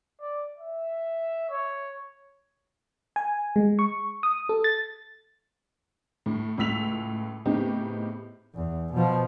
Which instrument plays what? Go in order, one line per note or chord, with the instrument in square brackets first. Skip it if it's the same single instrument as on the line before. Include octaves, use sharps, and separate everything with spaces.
[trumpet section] D5
E5
C#5
[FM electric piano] G#5
G#3
C#6
D#6
A4
A6
[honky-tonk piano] A2
C#2 A2 E6 B6 F7
A2 C#3 B3 C4 D#4 G4
[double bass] E2
B2 F3